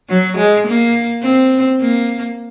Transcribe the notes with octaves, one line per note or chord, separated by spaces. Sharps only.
F#3
G#3
A#3
C4
A#3